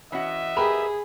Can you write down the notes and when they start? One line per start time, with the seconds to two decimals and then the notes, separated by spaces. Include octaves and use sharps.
0.12 E3 C#4 F#4 D#5 E5
0.57 G4 G#4 A#4 B4 B5